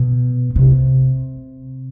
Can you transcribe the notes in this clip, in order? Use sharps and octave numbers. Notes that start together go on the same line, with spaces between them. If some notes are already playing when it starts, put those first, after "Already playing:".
Already playing: B2
C3